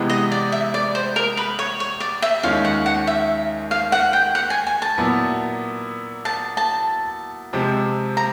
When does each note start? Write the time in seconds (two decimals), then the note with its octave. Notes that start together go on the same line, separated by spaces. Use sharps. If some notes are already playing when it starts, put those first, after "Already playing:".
Already playing: C3 E3 G#3 B3
0.09 D#5
0.32 D5
0.52 E5
0.74 D5
0.95 C5
1.16 A#4
1.37 B4
1.59 C#5
1.80 C#5
2.00 D5
2.22 E5
2.43 D#2 D#3 G#3 C#4 F4 F5
2.65 F#5
2.86 F#5
3.07 E5
3.71 F5
3.92 F#5
4.13 G5
4.35 F#5
4.50 G#5
4.67 G#5
4.82 A5
4.98 A#2 F#3 B3 E4
6.25 A5
6.57 A5
7.53 C3 F3 G#3 C4
8.17 A#5